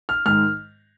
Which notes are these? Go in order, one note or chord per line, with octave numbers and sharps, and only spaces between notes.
F6
G#2 D#3 G#3 F6